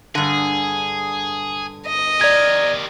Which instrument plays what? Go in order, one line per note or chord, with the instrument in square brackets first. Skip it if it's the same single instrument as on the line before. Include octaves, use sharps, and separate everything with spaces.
[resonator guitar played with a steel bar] G2 D3 [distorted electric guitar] G#4
[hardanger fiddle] D#5
[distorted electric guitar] G4 A#4 [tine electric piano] D5 G#6